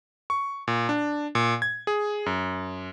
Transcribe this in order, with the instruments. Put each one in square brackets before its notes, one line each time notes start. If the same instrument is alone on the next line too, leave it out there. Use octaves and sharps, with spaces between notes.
[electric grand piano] C#6
A#2
D4
A#2
G#6
G#4
F#2